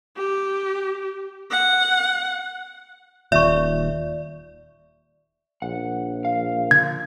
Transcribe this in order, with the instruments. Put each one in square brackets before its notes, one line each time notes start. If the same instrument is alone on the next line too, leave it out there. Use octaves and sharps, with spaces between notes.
[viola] G4
F#5
[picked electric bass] D#1 D#2 A#2 [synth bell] D5 [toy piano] E5 C#6
[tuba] A#1 [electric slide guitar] F#5
[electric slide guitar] F5
[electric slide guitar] D3 [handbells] G#6